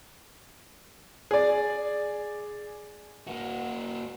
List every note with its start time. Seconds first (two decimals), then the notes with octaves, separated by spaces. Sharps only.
1.31 G#4 D5
3.27 A#3 F#4